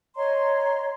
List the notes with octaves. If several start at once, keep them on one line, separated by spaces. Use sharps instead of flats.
C#5 D#5 A#5 C6